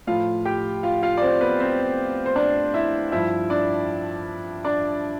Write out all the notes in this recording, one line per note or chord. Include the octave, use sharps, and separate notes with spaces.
A2 F3 F4 F5
G4 G5
F4 F5
F4 F5
D5
C4 C5
B3 B4
C4 C5
C5
D4 D5
E4 E5
G2 F3 E4 E5
D4 D5
D4 D5